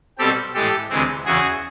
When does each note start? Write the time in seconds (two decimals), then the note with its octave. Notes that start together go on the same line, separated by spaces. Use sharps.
0.18 B2 G3 C4 G4 A4
0.54 A2 E3 G#3 G4 A4
0.90 D2 C3 E3 G#3 C4
1.25 E2 C#3 E3 F#4 G#4